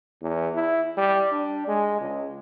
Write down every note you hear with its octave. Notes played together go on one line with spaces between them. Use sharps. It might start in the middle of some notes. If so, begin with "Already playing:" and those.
E2
E4
G3
D4
G#3
C#2